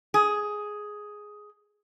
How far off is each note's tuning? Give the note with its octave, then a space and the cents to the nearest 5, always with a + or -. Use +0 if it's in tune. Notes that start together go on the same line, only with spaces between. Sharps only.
G#4 +5